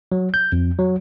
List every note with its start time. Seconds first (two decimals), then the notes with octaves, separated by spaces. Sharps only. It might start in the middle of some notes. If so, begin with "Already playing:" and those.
0.12 F#3
0.34 G6
0.52 F2
0.79 F#3